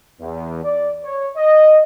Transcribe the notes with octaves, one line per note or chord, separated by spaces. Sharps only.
E2
D5
C#5
D#5